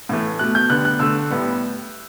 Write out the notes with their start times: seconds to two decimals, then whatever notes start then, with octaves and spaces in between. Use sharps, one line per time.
0.09 A2 E3 A3
0.39 B2 A3 F#6
0.55 G6
0.70 D3 G3 B3 F#6
0.85 F#6
0.99 D3 A3 E6
1.30 A2 G3 B3